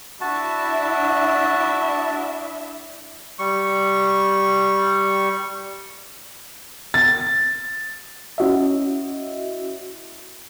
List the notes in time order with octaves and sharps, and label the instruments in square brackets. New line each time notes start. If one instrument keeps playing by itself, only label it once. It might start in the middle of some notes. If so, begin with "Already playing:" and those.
[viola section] D4 E4 E5 [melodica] F#4 A5
[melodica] G3 C#6
[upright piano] A6
[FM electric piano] C#4 E4 F#4 D#5 E5